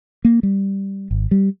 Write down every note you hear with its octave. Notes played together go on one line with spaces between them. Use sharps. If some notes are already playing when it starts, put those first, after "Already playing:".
A#3
G3
G#1
G3